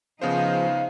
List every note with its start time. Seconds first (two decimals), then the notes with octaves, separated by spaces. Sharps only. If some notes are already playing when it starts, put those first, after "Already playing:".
0.22 C#3 F3 B3 D#4 F4 G#4 C5 F5